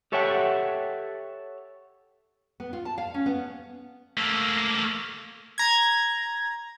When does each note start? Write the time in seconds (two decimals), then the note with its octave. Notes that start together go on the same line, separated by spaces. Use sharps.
0.12 G4 A4 C#5 E5 F#5 G5
2.60 B3
2.73 F4
2.85 A5
2.98 F5
3.14 C#4
3.26 B3
4.17 A3 A#3
5.58 A#5 G#6